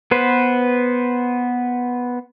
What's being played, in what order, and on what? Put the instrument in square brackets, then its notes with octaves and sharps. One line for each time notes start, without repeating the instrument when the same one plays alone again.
[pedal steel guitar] B3 B4 C5